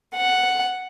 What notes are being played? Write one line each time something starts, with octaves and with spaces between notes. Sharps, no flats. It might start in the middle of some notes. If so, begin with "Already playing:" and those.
F#5